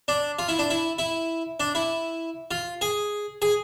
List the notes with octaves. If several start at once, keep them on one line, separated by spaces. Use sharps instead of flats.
D4
F4
E4
D4
E4
E4
D4
E4
F4
G#4
G#4